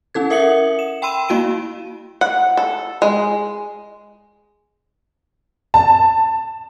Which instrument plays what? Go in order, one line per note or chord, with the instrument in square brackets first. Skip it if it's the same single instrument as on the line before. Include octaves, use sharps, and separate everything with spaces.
[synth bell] C#4 E4 A4 G#6
A#4 E5 F#5 D#6 C#7 F#7
E7
G5 B5 C6 E6 D#7 E7
A#3 E4 F#4 F5 D7 D#7
[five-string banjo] F#5
A4
G#3
[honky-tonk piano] A5